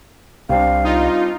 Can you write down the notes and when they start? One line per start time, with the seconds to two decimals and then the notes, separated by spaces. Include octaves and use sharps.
0.49 C2 G3 C4 D4 F5
0.84 D#4 F4